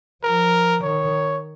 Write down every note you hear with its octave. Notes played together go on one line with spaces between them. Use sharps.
F3 A#4
D#3 C#5